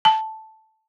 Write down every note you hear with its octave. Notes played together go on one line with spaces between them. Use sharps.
A5